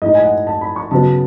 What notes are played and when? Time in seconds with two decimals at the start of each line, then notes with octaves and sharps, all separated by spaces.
0.02 A2 G#3 D#4 D#5
0.15 G#5
0.24 F#5
0.47 A5
0.61 B5
0.76 C#6
0.91 C#3 F#3 B3 A5